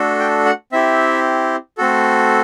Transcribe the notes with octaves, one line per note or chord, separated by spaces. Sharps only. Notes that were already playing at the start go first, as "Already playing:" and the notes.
Already playing: A3 D4 F#4 A4
G5
F#5
C4 E4 G4 E5
A3 C4 F#4 A4